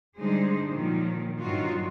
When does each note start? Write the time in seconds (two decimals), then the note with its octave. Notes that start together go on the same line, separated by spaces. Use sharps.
0.19 D3 G3 G#3 D#4 G#4 C5
0.70 A#2 D#3 F3 F#3
1.39 G2 D#3 F#3 D#4 F4 F#4